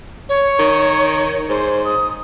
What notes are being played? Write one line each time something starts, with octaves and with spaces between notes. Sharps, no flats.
C#5
D#3
G#2 C5
D#6